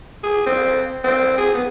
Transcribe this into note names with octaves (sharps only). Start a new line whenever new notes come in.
G#4
C4
C4
G#4
B3